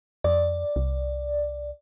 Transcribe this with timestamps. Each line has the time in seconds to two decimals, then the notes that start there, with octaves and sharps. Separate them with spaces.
0.24 F2 D5
0.76 C2